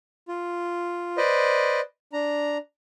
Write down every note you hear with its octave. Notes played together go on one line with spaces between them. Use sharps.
F4
B4 C5 D5 D#5
D4 A#5